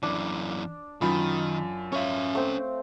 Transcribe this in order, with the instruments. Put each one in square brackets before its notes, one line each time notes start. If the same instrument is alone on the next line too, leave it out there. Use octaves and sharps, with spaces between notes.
[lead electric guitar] F#2 E3 [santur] D4
[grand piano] F#2 F4 B5 [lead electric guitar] D#3
[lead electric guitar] C#4 E5 [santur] C#5 F5
[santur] A3 C4